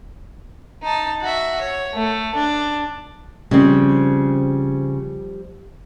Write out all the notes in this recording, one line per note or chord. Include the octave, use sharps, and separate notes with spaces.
D#4 A5
F#4 E5
C#5
A3
D4
C#3 F3 G3 C4